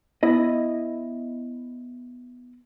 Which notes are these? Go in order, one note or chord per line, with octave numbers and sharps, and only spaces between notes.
B3 E4 D#5